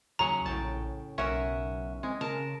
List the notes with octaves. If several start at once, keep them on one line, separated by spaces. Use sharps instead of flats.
D#2 C#3 F#3 F#5 A#5
A#1 A2 G5 A5
B1 C#4 A#4 E5 F#5
G#3 C4
C#3 A#4 A5